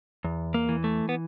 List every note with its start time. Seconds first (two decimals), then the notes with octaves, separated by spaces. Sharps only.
0.24 E2
0.54 A#3
0.69 E3
0.84 A3
1.09 B3